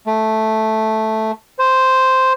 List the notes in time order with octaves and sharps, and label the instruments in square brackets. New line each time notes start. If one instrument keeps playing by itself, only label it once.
[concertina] A3
C5